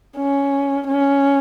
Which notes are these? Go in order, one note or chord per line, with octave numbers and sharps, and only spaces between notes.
C#4
C#4